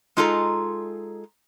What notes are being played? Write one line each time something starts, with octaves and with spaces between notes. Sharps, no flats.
G#3 D#4 F4 G#4 A4 A#5